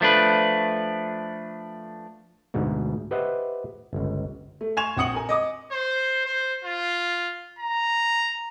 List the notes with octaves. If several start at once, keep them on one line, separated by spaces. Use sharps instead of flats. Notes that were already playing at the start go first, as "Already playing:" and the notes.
F3 A3 D4 B4
D2 G#2 B2
G4 B4 C5 D#5 E5 F#5
G1 C#2
A3
G#5 C6 C#6 G#6 E7 F7
A#1 C4 F#5 D#6 C#7 F#7
A#4 G#5
D#5 D6 D#6
C5
C5
F4
A#5